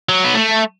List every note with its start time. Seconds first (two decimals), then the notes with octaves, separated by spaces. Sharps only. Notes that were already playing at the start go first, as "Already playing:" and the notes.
0.09 F#3
0.24 B3
0.34 A3